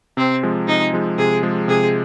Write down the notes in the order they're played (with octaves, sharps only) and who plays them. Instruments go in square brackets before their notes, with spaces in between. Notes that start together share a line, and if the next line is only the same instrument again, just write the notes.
[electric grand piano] C3 [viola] C4
[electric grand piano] F3 G#3
[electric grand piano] C3 [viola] D#4
[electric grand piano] F3 G#3
[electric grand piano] C3 [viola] G#4
[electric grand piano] F3 G#3
[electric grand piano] C3 [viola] G#4